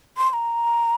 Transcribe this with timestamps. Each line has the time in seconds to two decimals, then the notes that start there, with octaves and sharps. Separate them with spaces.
0.17 C6
0.30 C6
0.33 A#5